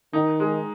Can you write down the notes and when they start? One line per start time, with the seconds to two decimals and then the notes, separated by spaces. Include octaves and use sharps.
0.13 D#3 D#4
0.40 G#3